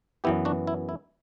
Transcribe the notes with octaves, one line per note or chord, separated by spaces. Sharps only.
F#2 E3 B3 E4 G4
D4 F#4
E4
E4